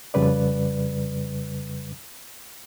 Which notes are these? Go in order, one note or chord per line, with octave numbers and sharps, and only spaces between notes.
F2 C#3 G3 B4 D5